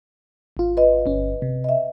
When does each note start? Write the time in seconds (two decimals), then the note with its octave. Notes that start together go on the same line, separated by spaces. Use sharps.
0.57 G#1 F4
0.77 B4 D#5
1.06 G1 C#4
1.42 C3
1.64 D#5 E5